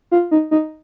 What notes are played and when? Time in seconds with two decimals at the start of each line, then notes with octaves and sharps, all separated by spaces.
0.11 F4
0.31 D#4
0.51 D#4